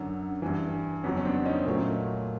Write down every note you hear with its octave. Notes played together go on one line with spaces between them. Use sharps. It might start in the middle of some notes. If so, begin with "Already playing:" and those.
Already playing: F#2 D3 F#3
G2 E3
F2 C#3 F#3 B3 C#4
C#4
C4 D4
C#4 D#4
A#2 F#3 A3